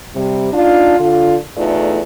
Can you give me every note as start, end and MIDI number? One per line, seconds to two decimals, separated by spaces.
0.15 0.48 48
0.15 0.48 55
0.53 0.97 62
0.53 0.97 63
0.53 0.97 65
0.98 1.35 50
0.98 1.35 65
1.57 2.00 40
1.57 2.00 45
1.57 2.00 57
1.57 2.00 63
1.57 2.00 65
1.57 2.00 74